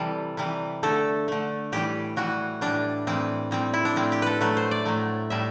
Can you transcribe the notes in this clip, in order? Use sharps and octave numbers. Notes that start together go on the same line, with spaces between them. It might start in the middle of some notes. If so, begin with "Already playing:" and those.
Already playing: C3 E3 G3 A4
C3 E3 G3
D3 A3 A4
D3 A3
A2 E3 G3 G4
A2 E3 G3 F#4
A2 E3 G3 D4
A2 E3 G3 C4
A2 G3 C4
E4
D4
A2 G3 C4
G4
A4 B4
A2 F#3 A3 B4
C5
D5
A2 F#3 A3
A2 G3 E5